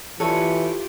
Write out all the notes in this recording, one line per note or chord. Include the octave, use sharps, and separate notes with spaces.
E3 F4 G4 A4 B4 C#5